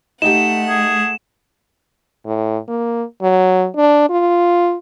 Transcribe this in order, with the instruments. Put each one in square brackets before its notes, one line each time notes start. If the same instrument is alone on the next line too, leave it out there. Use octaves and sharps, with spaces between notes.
[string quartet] A3 F#5 [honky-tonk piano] D#4 G4 [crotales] E7
[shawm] G#4
[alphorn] A2
A#3
F#3
D4
F4